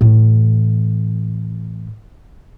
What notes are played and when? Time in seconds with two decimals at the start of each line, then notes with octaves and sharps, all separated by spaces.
0.01 A2 E3